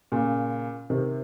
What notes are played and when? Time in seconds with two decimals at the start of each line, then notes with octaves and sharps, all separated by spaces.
0.12 A#2 C#3
0.90 C3 D#3